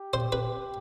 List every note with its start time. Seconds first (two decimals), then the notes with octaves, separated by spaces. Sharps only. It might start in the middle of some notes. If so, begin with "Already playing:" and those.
Already playing: G4
0.14 C5
0.32 B4